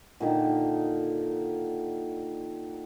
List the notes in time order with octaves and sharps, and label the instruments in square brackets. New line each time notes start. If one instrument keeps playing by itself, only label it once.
[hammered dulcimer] A#2 D3 D#3 D#4